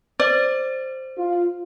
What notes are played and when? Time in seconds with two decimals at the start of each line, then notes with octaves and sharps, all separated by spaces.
0.20 C5 D5
1.18 F4